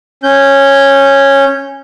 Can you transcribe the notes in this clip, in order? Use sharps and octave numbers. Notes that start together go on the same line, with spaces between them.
C#4 G6